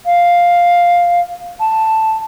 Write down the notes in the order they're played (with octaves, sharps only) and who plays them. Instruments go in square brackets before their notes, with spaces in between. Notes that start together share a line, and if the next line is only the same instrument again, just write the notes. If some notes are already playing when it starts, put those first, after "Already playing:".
[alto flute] F5
A5